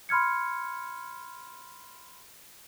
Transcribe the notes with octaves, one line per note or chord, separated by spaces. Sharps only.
B5 C6 F6 G#6 C#7